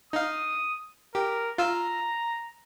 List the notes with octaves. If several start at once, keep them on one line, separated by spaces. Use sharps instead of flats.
D#4 F5 D#6
G4 A#4
F4 F5 A#5 E6